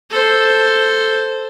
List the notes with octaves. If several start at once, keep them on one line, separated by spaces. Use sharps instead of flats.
A4 C5